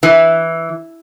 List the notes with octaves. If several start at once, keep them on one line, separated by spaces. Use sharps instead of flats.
E3